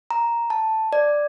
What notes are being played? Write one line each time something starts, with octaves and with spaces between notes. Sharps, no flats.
A#5
A5
D5